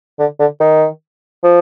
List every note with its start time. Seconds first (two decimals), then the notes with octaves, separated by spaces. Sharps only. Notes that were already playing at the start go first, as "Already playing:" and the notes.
0.19 D3
0.39 D3
0.60 D#3
1.43 F3